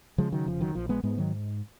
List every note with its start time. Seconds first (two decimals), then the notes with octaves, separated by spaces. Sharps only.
0.18 C#3 F3 G#3
0.32 D#3 F#3
0.46 F1 F3
0.61 D#3 F#3
0.75 A#1 F3
0.89 G#3 B3
1.03 G#2 G#3 B3
1.18 D#3 F#3